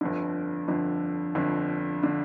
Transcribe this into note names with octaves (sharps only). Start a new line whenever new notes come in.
G1 F2 D3
G1 F2 D3
G1 F2 D3
D3